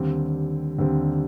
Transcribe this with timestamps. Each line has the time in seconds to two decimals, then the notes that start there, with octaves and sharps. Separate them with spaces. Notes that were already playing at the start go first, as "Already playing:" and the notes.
Already playing: D#2 D3 G3 C4
0.79 D#2 D3 G3 C4